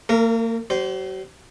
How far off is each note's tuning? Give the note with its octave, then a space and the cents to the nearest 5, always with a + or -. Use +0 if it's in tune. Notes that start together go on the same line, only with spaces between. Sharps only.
A#3 -40 A#4 +0
F#3 +45 C5 -5